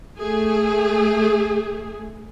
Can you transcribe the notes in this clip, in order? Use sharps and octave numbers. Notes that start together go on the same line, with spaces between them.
A3 G#4